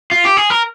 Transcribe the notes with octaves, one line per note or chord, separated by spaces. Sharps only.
F4
G4
G#4
A#4